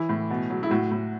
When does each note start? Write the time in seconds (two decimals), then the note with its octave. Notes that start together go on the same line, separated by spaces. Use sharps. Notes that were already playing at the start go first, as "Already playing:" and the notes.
Already playing: E3 E4
0.09 A2
0.30 B2
0.50 F#3
0.63 E4
0.70 A2 F#4
0.91 A2